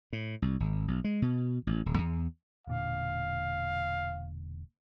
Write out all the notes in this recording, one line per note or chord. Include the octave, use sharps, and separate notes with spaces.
A2
C2
G#1
B1
G#3
B2
A1
D#1
E2
E1 A#2 D3 F5